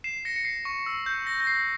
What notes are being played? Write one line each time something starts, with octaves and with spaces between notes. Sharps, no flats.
C7 E7
A#6 C#7
C#7
C7
C#6
E6
G6
A#6
A#6
C7